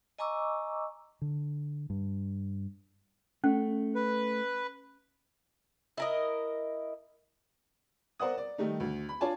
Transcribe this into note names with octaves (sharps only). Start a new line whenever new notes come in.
D#5 G#5 A#5 C#6 D6 E6
D3
G2
A3 C#4
B4
E4 A#4 D#5
A#4 C5 D5 F#5 D#6
D5
D#3 G3 A3 D#4
D2
B5
D4 F4 C#5 D5 G#5 A5